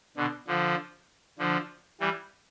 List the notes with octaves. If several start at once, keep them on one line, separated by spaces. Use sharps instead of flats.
B2 D3
D3 F3
D3 F3
E3 G3